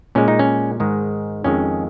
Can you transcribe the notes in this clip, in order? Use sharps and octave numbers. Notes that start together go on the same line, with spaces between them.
A#2 G#3 C#4
D#4
C#4
G#2 D#3 G#3
F2 D#3 G#3 C#4